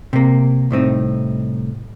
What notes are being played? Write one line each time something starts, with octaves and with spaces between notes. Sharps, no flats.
C3 A#3
C2 A2 C4 D#4